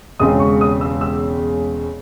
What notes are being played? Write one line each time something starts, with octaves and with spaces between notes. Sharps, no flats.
E1 E2 C#3 G#3 C4 D#6
C#6
D#6
E6
E6